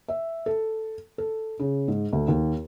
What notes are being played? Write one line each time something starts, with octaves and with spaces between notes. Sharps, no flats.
E5
A4
A4
C#3
G#2
D2
D#2